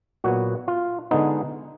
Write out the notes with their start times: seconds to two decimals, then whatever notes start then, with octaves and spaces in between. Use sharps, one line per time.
0.24 A#2 F#3 B3 F#4
0.68 F4
1.11 D3 G#3 B3 D#4